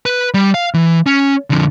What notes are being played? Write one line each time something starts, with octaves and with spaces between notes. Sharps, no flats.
B4
G3
F5
E3
C#4
F2 D3